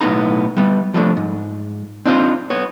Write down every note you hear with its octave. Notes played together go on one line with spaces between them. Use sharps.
B1 A2 B3 D#4 A#5
G3 B3
F3 G3 A3 D4
G#2
C4 D4 D#4 F4 C5
B3 C#5